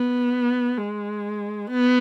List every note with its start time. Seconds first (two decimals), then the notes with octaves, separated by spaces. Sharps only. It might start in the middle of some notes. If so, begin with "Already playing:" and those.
Already playing: B3
0.77 G#3
1.70 B3